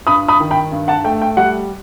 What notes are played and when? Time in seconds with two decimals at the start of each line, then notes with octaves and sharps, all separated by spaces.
0.07 G2 B5 D#6
0.28 B5 D#6
0.40 D#3
0.51 G5 B5
0.72 G2
0.88 F#5 A5
1.04 A3 G5
1.22 G5
1.37 G3 F#5